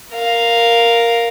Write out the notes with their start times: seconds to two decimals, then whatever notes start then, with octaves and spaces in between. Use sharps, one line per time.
0.13 A#4 F5